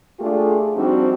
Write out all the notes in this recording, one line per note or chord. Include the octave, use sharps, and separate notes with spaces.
A3 D4 F4 G4 G#4
F3 G3 C4 D4 D#4 F#4